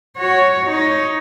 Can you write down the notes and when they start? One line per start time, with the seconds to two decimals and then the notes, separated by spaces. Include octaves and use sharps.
0.17 F#4 C#5
0.66 D#4 C#5